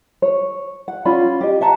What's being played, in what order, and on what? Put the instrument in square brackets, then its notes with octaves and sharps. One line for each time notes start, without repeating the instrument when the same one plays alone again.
[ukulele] C#5
F#5
C#4 F4 D5 B5
G4 D#5
E5 F#5 A5 A#5